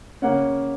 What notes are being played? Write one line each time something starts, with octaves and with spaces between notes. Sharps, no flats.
C#3 A#3 C#4 F#5